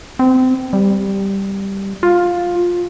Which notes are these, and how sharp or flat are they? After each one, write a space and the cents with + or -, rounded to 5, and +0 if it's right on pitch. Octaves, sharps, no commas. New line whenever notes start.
C4 -25
G3 +0
F4 +10